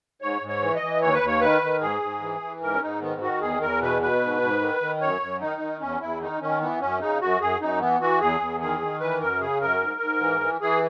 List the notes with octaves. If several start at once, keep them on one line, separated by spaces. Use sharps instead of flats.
G#2 C#5
G#2
C#5
E3
D#5
E3
D#2 C#5
B4
D#2 C#5
D#3 B4
D#3
G#2 G#4
G#2
E3
E3
G#2 A#4
C#4
G#2 D#4
D#3 B3
D#3 F#4
E2 G#4
E2 A#4
B2 B4
B2 B4
G#2
G#2
D#3
D#3
F#2 C#5
F#2
D#3 D#4
D#3
E2 C#4
E2 E4
D#3 D#4
D#3 C#4
E3 B3
F#2 C#4
C#3 D#4
F#2 F#4
F#2 G#4
F#2 D#4
E3 B3
E3 F#4
E2 G#4
E2
D#3 G#4
D#3
E3 B4
F#2 A#4
C#3 G#4
F#2 A#4
G#2
G#2
E3
E3
E3 G#4